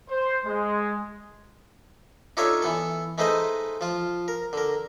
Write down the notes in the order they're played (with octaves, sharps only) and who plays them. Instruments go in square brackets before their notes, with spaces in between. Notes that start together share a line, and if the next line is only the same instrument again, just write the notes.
[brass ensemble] C5
G#3
[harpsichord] D4 D#4 F4 A4 C#5 E5
E3 B3 A4
G#3 A3 D#4 B4 C5 D#5
F3 F4
A#4
D3 A#4